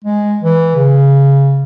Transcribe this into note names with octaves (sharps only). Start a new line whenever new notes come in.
G#3
E3
C#3